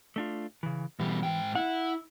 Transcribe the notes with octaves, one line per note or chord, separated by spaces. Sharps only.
A3 D4 F4
C#3 E3
B2 E3 G3
G#2 G5
E4 F#5